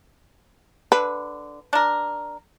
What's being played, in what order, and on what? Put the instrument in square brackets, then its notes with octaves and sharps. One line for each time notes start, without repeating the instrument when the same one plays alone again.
[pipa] D3 [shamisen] B4
[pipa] D4 A#4